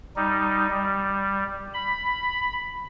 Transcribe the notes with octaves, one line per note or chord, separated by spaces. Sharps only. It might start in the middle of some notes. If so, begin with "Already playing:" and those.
G3 D#4
G3
B5